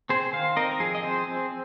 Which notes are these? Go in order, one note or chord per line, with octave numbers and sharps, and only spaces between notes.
C4 G#4 C5
D#3 C5 F5
C4 A#4 D#5
A#4
F3 G#4
D#5
C4 G#4 C5
C4